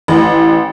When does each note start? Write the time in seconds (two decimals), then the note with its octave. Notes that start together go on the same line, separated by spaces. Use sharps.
0.08 A1